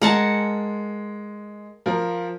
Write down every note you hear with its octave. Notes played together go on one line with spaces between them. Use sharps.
G#3 A#4 F#5 A5
F3 A#4